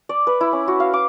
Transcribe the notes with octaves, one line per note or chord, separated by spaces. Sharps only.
D5
B4
E4
C#4
F#4
F5
D6